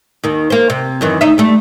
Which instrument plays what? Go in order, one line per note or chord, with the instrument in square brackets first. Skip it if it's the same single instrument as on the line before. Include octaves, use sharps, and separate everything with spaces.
[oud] D#2 D#3
A#3 C5
C3
F#2 D#3 E3
D2 D#4 E5
G3 A3